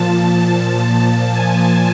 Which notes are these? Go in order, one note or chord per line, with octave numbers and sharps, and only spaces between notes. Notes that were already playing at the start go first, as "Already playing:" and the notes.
Already playing: A#2 F3 A5
A5
G#5